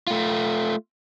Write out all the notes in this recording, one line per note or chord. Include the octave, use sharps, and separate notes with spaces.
A3 F4